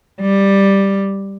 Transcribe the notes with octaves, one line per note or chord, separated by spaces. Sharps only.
G3